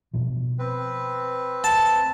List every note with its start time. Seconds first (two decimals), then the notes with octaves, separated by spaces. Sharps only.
0.14 B2 F3
0.59 C4 B4
1.64 A5